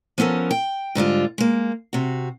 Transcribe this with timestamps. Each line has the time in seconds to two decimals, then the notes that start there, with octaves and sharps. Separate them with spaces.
0.18 F3 B3 C#4 A4 A#4
0.51 G5
0.95 G#2 D3 G3 F4
1.38 G#3 A#3
1.93 C3 F#4